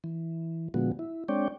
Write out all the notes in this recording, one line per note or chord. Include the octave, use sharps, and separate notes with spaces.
E3
A#2 D3 F3 G#3 B3 F#4
E4
G#3 C4 D4 C#5 D5 G5